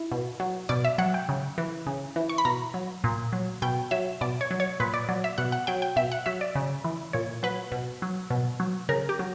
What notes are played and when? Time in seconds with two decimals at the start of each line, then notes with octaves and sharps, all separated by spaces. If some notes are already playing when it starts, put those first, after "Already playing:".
Already playing: E4
0.12 B2
0.40 F#3
0.69 B2 D5
0.85 E5
0.98 F#3 F#5
1.14 G5
1.29 C#3
1.58 E3
1.86 C#3
2.16 E3
2.29 C#6
2.38 B5
2.45 B2 A#5
2.74 F#3
3.04 A#2
3.33 F#3
3.62 B2 G5
3.91 F#3 E5
4.21 B2 D5
4.41 C#5
4.51 F#3
4.60 C#5
4.80 A#2 B4
4.94 D5
5.09 F#3 D5
5.24 E5
5.38 B2 F#5
5.52 F#5
5.67 F#3 G5
5.82 G5
5.96 B2 E5
6.12 F#5
6.26 F#3 E5
6.41 D5
6.55 C#3
6.84 E3
7.13 A#2 C#5
7.43 F#3 B4
7.72 B2
8.02 F#3
8.30 B2
8.60 F#3
8.89 C#3 A#4
9.09 G4
9.19 F#3